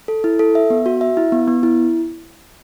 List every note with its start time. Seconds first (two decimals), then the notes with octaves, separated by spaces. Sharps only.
0.08 A4
0.24 E4
0.39 A4
0.55 E5
0.70 B3
0.86 F#4
1.01 E5
1.17 E4
1.32 B3
1.48 B3
1.63 E4